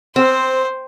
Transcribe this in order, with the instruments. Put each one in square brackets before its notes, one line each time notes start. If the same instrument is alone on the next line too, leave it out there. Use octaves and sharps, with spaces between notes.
[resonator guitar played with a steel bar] C4 [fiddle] C5